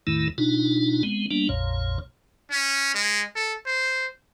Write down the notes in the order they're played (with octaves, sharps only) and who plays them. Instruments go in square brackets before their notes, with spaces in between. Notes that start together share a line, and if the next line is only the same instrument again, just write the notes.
[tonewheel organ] E2 A2 D#3 A3 E4
B2 D4 D#4 F4
G#3 B3 C4
G3 A#3 B3 D4
A#1 F2 A#2 C#5
[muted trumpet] C#4
G#3
A4
C5